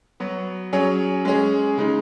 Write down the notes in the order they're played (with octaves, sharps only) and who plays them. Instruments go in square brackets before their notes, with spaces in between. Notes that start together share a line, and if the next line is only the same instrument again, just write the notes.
[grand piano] F#3 B3 F#4
F#3 C#4 G#4
G#3 C#4 G#4
C#3 G#3 D#4